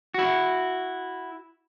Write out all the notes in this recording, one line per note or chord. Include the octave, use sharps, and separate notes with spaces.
E4 F#4